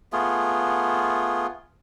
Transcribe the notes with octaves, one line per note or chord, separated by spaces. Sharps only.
A3 B3 F4 G#4